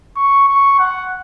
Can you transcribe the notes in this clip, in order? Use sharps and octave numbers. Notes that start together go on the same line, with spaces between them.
C#6
C#6
F#5